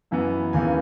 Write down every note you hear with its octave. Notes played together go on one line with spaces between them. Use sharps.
F#2 E3 B3
D#2 C#3 E3 B3 G#5